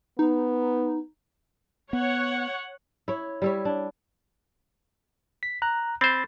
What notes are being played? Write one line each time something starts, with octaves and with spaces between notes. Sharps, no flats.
B3 D#4
B3 C#5 F#5
E4 C#5
G3 E4 C#5
D4
B6
A#5 F#6
C4 C5 B5 A6